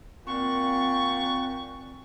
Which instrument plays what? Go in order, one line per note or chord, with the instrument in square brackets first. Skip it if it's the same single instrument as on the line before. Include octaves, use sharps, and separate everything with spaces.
[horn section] A#2 F#5 G5 [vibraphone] C4 [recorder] C#6